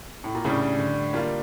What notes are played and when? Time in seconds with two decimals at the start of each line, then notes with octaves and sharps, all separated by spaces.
0.24 A2
0.35 A#2
0.45 A2 C#3 G3 D4
0.79 D3
1.13 G3 A#3 D4 F4